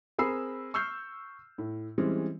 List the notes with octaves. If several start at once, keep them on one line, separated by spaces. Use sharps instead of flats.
C4 G#4 A#4 B5 E6 C7
C#6 E6 F6 G6 C7
A2
E3 G3 G#3 C4 C#4